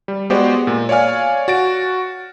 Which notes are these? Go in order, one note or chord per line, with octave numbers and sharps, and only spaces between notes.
G3
G#3 B3 F#4 G4 C5 D5
A#2
C#5 D5 F5 G#5 F6
F#4 A6 D7